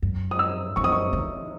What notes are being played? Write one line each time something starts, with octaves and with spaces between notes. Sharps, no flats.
F#2
D#6
E6
F#2 C#6
D#6
C#6
D#3